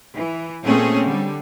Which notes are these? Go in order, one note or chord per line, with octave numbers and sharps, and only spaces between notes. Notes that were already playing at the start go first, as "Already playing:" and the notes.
E3
A#2 A3 C4 C#4 G#4
D3 G3